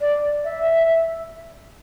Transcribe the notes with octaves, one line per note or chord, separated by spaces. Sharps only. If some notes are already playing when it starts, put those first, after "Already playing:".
D5
E5